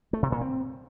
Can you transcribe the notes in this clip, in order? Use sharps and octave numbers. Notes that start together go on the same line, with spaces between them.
A3
C3
A#2
C4